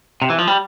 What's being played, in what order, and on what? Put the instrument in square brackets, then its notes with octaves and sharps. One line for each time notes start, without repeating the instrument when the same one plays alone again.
[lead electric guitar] C3
E3
F3
G3